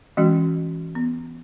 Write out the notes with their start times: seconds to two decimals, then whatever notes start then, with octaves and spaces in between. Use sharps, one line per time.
0.17 E3 G#3 C#4 F#4
0.95 B3